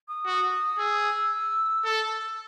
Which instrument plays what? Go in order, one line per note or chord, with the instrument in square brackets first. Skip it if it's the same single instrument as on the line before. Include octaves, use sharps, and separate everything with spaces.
[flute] D#6
[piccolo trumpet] F#4
[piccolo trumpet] G#4 [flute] E6
[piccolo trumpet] A4